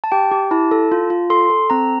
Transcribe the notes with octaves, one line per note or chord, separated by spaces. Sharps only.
A5
G4 G5
G4
E4 A5
A4
F4
F4
A4 C6
A4
C4 A#5